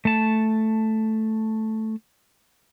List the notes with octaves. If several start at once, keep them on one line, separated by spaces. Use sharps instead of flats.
A3 A5